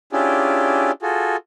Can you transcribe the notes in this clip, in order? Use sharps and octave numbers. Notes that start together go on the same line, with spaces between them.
C#4 D4 E4 F4 G4 G#4
F4 F#4 G#4 A4